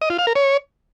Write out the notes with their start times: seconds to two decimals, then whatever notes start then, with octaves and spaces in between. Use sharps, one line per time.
0.02 D#5
0.10 F4
0.19 F5
0.27 A#4
0.35 C#5